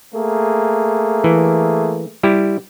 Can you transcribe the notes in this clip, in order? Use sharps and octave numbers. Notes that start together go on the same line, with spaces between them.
A3 A#3 G#4
E3
G3 E4 G4